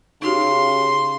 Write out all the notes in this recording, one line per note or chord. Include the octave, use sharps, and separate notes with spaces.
C#3 D#4 F#4 G4 C6